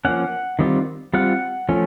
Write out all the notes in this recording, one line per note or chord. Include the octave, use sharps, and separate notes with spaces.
F3 A#3 C#4 F#5
D#3 G3 C4 F4
G3 C4 F4 F#5
F3 A3 C#4